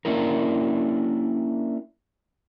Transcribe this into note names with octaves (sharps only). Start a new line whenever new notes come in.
A#3 C#4 D4 E4 A#4